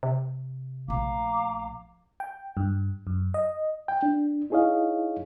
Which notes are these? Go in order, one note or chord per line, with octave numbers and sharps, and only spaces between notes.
C3
A#1 A3 F5 A#5 D6
G5
G2
F#2
D#5
G5
D4
D#4 E4 G#4 C#5 D#5 F5